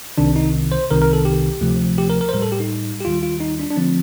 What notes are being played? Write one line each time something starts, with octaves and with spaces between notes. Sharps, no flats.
C2 C3 D#3 D4
D#4
C5
C2 C3 D#3 A#4
A#4
A4
G4
D2 C3 F3 A3
G4
A#4
A#4
C5
A2 G3 A#4
A4
G4
D#4
G4
D#2 D#3 G3 F4
F4
D#4
D4
D4
D3 F3 A3 C4